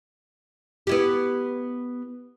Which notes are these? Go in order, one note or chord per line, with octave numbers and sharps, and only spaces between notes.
B3 E4 G4